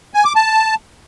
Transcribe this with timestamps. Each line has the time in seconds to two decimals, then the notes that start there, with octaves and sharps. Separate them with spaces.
0.14 G#5
0.25 D6
0.36 A5